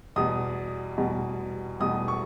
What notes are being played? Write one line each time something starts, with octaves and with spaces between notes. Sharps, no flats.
E2 B2 G3 D#6
E2 B2 G3
E2 B2 G3 D#6
C#6